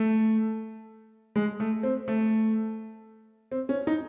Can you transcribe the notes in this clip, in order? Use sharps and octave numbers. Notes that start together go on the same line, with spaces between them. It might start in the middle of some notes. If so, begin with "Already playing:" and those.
Already playing: A3
G#3
A3
C4
A3
C4
C#4
D#4